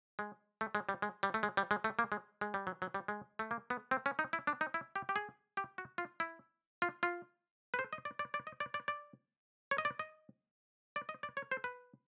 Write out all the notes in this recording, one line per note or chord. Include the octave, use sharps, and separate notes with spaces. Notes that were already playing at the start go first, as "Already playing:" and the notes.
G#3
A3
G#3
G3
G#3
G3
A3
G#3
G3
G#3
A3
A#3
G#3
G#3
G3
F#3
F#3
G3
G#3
A3
A#3
B3
C4
C#4
D#4
E4
D4
D#4
E4
G4
G4
G#4
G4
F#4
F4
E4
F4
F4
B4
C5
D#5
D5
D5
D5
D#5
D5
D5
D5
C#5
D#5
D5
D#5
D5
D#5
D5
C#5
C5
B4